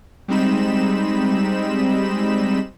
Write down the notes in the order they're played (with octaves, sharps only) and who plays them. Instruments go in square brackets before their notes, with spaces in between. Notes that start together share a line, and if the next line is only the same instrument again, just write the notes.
[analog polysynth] G3 G#3 C4 D#4 B5 E7